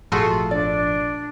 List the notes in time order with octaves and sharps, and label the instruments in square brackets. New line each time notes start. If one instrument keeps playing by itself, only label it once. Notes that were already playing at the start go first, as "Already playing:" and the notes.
[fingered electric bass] G#1 A#2 F3 [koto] A3 F4 F#4 [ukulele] G#4
[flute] D4 [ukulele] D5